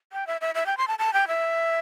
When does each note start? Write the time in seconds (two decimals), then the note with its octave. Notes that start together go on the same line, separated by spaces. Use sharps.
0.13 G5
0.27 E5
0.41 E5
0.55 E5
0.66 G5
0.77 C6
0.88 A5
0.99 A5
1.13 G5
1.28 E5